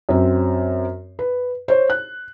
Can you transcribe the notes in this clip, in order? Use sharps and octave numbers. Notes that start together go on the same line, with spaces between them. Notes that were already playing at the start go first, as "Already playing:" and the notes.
F#2 C4
B4
C5 C#5
F#6